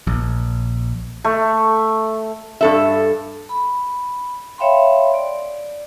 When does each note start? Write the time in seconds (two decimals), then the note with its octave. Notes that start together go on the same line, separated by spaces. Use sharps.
0.07 A#1
1.24 A3
2.61 G2 A4 E5
3.49 B5
4.58 C#5 E5 F5 G5 B5 C6
5.14 D5